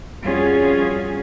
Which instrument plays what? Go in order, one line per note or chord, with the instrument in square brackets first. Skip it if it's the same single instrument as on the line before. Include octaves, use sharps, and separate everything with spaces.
[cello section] F2 G3 C#4 F4 F#4 G#4